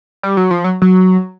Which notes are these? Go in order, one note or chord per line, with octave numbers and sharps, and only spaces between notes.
G3
F#3
F3
F#3
F#3